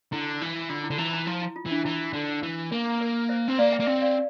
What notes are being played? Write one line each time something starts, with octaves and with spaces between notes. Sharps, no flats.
D3 E4
E3
D3 F4
E4
D3
E3 E4
E4
F3 E4
E4
F4
E3 D4
E3 E4
D3
E3
A#3
A#4
C5 E5
C4
A#3 D5 F5
E5 G5
A#3
C4 E5 G5
D5 F5